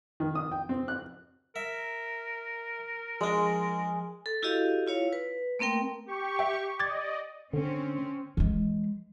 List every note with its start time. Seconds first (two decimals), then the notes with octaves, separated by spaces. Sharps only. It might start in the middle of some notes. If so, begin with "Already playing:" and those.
0.20 D#3
0.35 D#6
0.52 G5
0.69 C4
0.88 F#6
1.56 A#4 E5
3.21 F3 G#3 D4
4.26 A4
4.43 E4 F#4 G4 A4 D#5 F5
4.87 E4 F4 C#5 F5
5.13 B4
5.59 A3 A#3 C4 A#4 G5
6.06 G4 C#6
6.39 E5 G5
6.80 D5 D#5 D6 G#6 A6
7.53 D3 C4 C#4
8.37 E3 G#3